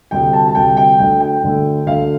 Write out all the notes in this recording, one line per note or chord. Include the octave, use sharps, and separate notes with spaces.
D2 C3 G3 G5
A5
A5
D2 C3 G3 G5
G5
D2 D3 A3 G5
G5
D2 D3 A3
D2 D3 A3 F5